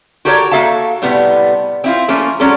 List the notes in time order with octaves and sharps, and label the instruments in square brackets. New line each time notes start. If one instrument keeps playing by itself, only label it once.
[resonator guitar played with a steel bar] F#4 G4 A4 A#4 C5 C#5
A#3 F#4 A4 E5 F5 A5
A2 C3 G3 B3
C4 E4 F4
F3 A3 A#3 C#4
F#3 G#3 C#4 D4 A4